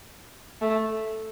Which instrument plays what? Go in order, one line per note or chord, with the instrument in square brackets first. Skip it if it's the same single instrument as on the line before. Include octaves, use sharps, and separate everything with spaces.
[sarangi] A3